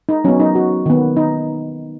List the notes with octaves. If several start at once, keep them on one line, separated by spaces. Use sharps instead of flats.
D#4
F#3 B3 C#4
D#4
F#4
D#3 B3
D#4